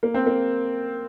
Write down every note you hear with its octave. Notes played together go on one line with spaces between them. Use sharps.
A#3
C4
A#3